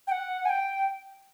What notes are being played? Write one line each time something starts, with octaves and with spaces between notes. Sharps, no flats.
G5
F#5
G#5
G5